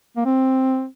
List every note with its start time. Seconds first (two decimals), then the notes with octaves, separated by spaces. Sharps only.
0.16 A#3
0.25 C4